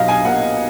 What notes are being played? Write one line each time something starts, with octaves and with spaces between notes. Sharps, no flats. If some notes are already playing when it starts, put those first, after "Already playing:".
Already playing: B1 B2 D#5 F5
G#5
A#3 F#5